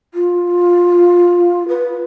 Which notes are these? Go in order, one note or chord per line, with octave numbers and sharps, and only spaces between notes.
F4
B4